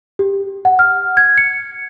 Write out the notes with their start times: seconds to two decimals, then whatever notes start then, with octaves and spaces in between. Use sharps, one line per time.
0.19 G4
0.65 F#5
0.79 F6
1.17 G#6
1.38 C#7